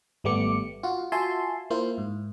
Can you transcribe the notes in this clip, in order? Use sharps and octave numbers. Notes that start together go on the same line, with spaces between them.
G#1 G3 A3 B3 D6 C#7
F4 F#4
F4 F#4 E5 G#5 A5 C6
A#3 E4 F4 C5
G#2